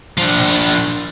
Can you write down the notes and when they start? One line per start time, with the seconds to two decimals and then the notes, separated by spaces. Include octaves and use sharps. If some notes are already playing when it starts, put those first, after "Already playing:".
0.18 F3 D4